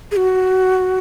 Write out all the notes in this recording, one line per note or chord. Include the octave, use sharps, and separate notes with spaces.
G#4
F#4